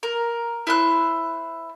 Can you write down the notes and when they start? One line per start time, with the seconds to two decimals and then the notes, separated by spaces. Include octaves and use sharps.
0.03 A#4
0.67 E4 C5 F#6